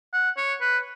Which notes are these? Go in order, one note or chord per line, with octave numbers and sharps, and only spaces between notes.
F#5
C#5
B4